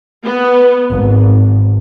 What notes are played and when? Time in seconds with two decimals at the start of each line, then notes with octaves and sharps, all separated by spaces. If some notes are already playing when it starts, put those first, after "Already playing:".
0.24 B3
0.91 G#1